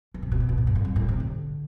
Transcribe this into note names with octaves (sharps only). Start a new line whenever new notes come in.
E3
C3
B2
C3
B2
A2
G2
F2
G2
A2
C3
D3